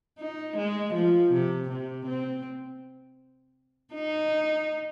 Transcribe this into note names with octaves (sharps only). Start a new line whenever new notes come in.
D#4
G#3
F3
C3
C3
C4
D#4